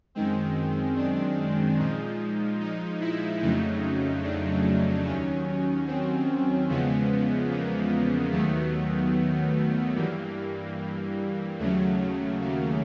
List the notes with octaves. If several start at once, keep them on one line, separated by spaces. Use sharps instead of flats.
F#2 D#3 G#3 C4
D4
A#2 F3 G#3 D#4
D#4
E4
F2 C#3 F#3 A3 D#4
D4
D#2 D#3 F#3 C#4
C4
E2 C#3 F3 G#3 B3
A#3
D#2 D#3 F#3 A3 B3
G2 E3 G3 A#3
D#2 C#3 F#3 A3
A#3